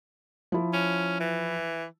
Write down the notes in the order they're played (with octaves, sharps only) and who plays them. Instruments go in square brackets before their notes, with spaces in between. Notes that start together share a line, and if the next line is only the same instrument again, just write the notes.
[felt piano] F3 E4
[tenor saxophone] C#4
E3